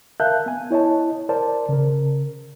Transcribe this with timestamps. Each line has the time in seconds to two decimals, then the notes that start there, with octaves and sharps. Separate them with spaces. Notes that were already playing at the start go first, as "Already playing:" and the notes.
0.20 A#4 E5 F5 A5 F#6 G6
0.46 B3 G#5
0.71 E4 C#5 D#5 A5
1.29 A#4 C5 D5 A5
1.69 C#3 A#4